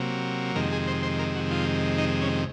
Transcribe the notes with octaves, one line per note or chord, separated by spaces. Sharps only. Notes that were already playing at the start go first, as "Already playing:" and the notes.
Already playing: C3 F#3 A#3
F2 C3 D#3 G#3 A#4
G#4
C5
C5
A#4
F#4
F4
D#4
C#4